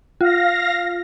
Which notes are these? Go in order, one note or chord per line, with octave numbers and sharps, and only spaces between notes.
F4 F5 A#6